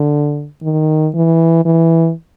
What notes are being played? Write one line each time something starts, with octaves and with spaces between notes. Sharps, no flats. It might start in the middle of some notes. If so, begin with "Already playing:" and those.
Already playing: D3
D#3
E3
E3